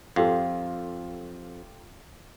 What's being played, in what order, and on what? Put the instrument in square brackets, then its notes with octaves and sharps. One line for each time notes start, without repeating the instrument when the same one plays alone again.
[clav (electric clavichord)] F2 [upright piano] F4 G4 A4 [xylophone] F5